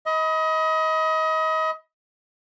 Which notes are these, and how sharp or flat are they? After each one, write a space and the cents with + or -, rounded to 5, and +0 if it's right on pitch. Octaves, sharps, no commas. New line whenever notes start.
D#5 +30 B5 +0